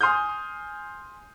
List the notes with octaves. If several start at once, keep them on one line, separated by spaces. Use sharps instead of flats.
G#5 C6 D#6 F6 G6